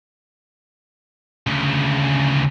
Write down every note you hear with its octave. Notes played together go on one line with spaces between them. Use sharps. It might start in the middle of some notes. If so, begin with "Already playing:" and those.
D2 C#3